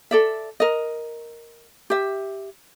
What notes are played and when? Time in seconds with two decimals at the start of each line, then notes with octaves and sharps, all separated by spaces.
0.11 A4 D5 E5
0.60 A#4 D#5
1.90 G4 E5